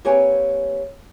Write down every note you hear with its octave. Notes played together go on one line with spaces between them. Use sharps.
A#3 C4 G4 B4 C#5 G#5